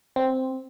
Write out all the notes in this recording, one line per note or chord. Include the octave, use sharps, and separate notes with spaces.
C4